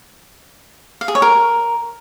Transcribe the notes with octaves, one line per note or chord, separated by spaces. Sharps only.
F5
G#4
C#5
A#4